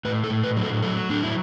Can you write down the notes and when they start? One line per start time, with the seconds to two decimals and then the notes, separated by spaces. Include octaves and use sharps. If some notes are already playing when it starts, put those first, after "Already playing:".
0.05 A2 B4
0.24 A4
0.30 A2
0.43 B4
0.57 F#3
0.63 A4
0.82 F#3 A4
1.09 A2 D4
1.23 E4